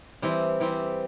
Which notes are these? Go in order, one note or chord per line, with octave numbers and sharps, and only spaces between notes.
E3 G3 C4
E3 G3 C4